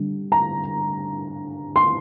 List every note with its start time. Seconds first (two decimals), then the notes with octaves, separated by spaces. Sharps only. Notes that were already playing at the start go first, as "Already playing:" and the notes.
Already playing: D3 G3 D4
0.32 A#5
1.76 C6